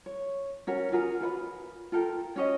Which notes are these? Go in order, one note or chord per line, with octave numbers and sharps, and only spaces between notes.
C#5
C#4 F#4 A#4
F4 F#4 G#4 A#4
F4 B4 F#5 B5
F4 A4 A#4 G5
C#4 F#4 C#5 D#5